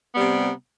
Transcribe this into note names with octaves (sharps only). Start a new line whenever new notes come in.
C3 G3 B3